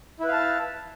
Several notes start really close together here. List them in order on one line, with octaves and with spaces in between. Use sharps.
E4 B4 F5 A5